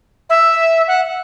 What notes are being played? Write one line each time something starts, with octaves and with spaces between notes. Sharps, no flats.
E5
F#5